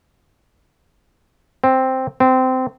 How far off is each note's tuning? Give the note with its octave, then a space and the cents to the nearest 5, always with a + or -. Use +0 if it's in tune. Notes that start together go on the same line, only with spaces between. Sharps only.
C4 +0
C4 -20